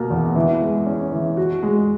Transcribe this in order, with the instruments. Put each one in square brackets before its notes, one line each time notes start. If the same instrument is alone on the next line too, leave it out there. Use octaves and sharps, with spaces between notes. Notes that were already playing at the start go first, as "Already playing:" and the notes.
Already playing: [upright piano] B2 A#3
E2
E3
G#3
C#4
E3
F#4
G#3